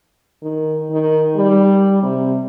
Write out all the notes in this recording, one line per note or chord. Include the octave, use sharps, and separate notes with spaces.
D#3
D#3
G3
C3